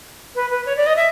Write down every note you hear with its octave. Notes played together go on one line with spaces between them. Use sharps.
B4
B4
C#5
D5
D#5
E5